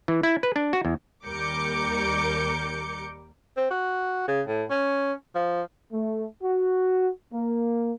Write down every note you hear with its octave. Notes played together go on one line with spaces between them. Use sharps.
E3
E4
B4
D4
F#4
E2
D#2 G3 A#4 D6 G6 C#7
C4
F#4
C#3
A2
C#4
F3
A3
F#4
A#3